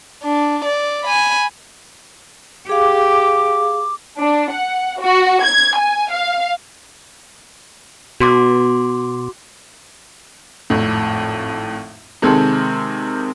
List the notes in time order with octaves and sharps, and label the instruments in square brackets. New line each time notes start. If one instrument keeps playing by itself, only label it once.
[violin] D4
D5
G#5 B5
[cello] G4 [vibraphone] G#4 F5 [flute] D6
[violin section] D4
F#5
F#4
G#6
G#5
F5
[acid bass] B2 [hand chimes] F#4 C6 D6
[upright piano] G#1 F2 A2
C3 D#3 G#3 C4 A4